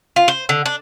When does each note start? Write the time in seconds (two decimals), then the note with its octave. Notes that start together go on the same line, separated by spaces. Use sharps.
0.16 F4
0.28 C5
0.49 D3
0.66 D4